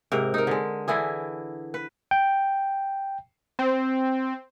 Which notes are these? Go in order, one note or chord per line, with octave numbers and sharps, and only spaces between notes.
G#2 C3 A#4
D#4 A#4
D3 G#3
D3 E3 E4 G#4
B4
G5
C4